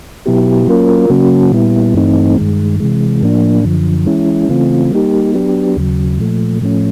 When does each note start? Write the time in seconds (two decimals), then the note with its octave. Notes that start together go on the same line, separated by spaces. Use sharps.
0.26 B2 F#3 B3 E4 G4
0.67 F#3 A#3 C#4 F4 A#4
1.10 C#3 F#3 A#3 C#4 F#4
1.52 A#2 G3 B3 E4
1.94 G2 E3 A3 C4 D#4
2.37 G2 D#3 G#3
2.80 C3 E3 G#3
3.22 A2 F3 A#3 D4
3.64 F#2 D3 F3
4.06 E3 G#3 C#4 E4
4.49 C#3 E3 A3 C4 F4
4.91 G3 A#3 D#4 G4
5.34 F#3 B3 D4 G4
5.77 D#2 C#3 F#3
6.19 A#2 F3 A3
6.61 A2 F3 A3 C#4